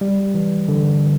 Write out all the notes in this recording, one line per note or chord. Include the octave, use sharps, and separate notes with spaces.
G3
E3
D3